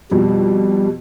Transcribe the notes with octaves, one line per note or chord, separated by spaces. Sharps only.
F2 B2 G3